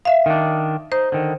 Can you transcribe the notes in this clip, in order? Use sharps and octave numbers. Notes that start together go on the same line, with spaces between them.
E5 F5
D#3 D4
D#4 C5
D3 D#3